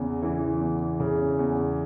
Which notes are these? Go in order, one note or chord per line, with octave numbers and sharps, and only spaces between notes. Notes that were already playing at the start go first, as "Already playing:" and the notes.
Already playing: E2 C#3
E3
E2
C#3
E2